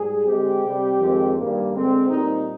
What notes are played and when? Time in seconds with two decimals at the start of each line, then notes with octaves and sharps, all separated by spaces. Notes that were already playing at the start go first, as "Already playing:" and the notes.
Already playing: G#2 G3 G#4
0.25 D3 G#3 C4 G4
0.63 C3 G3 C4
0.99 F2 D#3 G#3 C4
1.36 G2 D#3 G3 A#3
1.73 D3 G#3 C4
2.10 A#2 G3 C4 D#4